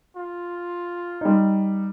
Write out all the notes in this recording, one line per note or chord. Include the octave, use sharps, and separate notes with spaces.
F4
G3 D#4